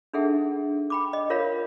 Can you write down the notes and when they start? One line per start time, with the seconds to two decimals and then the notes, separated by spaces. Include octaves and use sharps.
0.13 D4 D#4 G#4 A4 E5 F#5
0.90 G5 B5 D6
1.13 D#5
1.30 F4 A#4 C#5 F5 B5